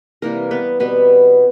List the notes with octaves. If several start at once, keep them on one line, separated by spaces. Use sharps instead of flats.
C3 E3 G3 A#3 A#4
B3 B4
B2 G3 B3 C4 B4